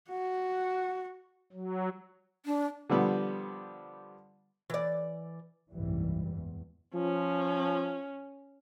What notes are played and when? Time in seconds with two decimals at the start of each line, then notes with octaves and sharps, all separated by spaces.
0.10 F#4 F#5
1.53 F#3
2.46 D4
2.89 D3 F3 G3 B3
4.70 E3 D5
5.73 F#1 C2 G#2 E3 G3
6.29 E2
6.95 F3 C#4